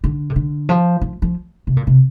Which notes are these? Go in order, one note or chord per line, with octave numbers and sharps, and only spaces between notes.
D3
C3
D3
F3
F3
F3
C3
A#2
C3